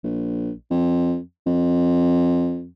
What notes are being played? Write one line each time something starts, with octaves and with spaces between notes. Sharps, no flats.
A#1
F2
F2